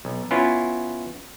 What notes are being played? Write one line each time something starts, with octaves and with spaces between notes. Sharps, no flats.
B1
B3 C#4 E4 F4